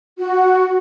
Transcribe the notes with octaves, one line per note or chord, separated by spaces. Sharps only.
F#4